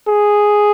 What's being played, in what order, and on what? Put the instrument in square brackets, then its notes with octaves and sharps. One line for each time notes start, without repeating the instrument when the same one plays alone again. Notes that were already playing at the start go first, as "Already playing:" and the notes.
[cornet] G#4